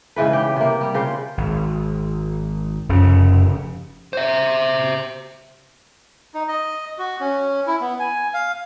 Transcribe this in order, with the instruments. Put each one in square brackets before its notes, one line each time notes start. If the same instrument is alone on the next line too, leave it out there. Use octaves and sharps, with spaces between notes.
[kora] G#2 C#3 E3 B4
G4 G5
C3 A#3
G3
C#3 F4 C5
[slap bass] G#1
[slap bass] F1 C#3 [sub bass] F#2
[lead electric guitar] C5 E5
[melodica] D#4
D#5
F#4
C#4
E4
B3
G#5
F5